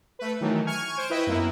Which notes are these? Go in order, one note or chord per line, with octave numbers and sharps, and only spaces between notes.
A3 B4
D#3 E3 F#3 A3
G#5 C#6 F6 G#6
C5 D7 E7
E4 B4 D#5 E5 G5
F#2 A#3 B3 E4